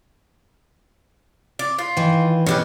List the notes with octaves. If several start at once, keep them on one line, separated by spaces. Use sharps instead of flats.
D5
F4
D#3 E3
B2 C#4 G4 B4